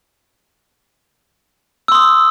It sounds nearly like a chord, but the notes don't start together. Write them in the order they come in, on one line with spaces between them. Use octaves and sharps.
E6 C6 D#6